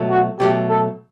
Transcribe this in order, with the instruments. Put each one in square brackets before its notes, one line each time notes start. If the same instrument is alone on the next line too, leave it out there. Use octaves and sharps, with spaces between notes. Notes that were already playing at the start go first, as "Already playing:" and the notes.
Already playing: [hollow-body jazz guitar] B2 F#3 A3
[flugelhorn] F#4
[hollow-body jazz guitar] B2 F#3 A3 [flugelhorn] G4
[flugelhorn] A4